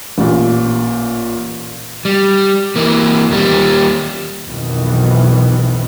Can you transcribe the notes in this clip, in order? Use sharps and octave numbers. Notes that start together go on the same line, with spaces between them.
A1 A#2
G3
E3 A#3
D#2 G3
B1 F2 B2 D#3 E3